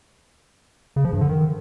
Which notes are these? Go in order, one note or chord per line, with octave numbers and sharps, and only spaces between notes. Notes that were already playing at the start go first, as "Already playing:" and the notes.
C#3
F3
G2
D3
D#3